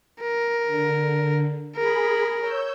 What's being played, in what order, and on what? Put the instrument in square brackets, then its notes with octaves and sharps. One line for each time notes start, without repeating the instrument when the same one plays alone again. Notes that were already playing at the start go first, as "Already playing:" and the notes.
[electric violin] A#4
[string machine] D3
[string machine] G#4 B5 [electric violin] A#4
[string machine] C#5 E6 G6